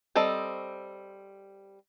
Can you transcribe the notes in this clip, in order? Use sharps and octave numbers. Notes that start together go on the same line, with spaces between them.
G3 C4 A4 D#5 A#5